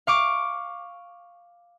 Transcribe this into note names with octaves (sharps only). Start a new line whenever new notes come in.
F5 C#6 D6